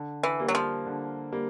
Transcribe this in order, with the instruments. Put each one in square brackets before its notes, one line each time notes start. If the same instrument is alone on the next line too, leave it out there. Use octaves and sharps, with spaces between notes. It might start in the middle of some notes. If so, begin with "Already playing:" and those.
Already playing: [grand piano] D3
[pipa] E3
[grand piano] G3 A#3
[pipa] F#3
F3
[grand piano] D3
G3 A#3